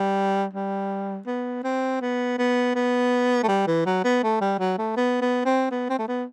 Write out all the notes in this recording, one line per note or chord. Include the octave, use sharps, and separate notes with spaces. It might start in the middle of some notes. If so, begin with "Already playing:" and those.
Already playing: G3
G3
B3
C4
B3
B3
B3
A3
G3
E3
F#3
B3
A3
G3
F#3
A3
B3
B3
C4
B3
C4
A3
B3